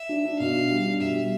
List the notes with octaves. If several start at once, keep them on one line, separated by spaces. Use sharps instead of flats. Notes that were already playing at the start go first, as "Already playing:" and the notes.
Already playing: E5
D4
D4
B2 F5
D4
G3
D4
B2 E5
G3